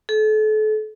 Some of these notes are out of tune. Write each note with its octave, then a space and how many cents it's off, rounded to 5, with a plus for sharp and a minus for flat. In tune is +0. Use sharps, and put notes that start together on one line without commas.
A4 -35